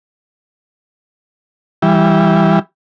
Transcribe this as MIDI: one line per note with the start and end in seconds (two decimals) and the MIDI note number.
1.82 2.59 52
1.82 2.59 55